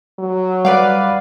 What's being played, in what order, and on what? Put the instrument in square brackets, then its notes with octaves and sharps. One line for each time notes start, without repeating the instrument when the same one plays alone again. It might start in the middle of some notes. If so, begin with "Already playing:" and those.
[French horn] F#3
[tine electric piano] G3 F#5 [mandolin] B4 D5 F5